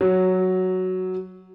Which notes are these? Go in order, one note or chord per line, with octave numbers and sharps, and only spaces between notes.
F#3